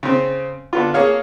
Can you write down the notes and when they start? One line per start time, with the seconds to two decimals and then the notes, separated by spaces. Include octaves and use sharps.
0.03 C#3 C4
0.73 D3 B3 F4
0.94 A#3 G#4 C#5 F5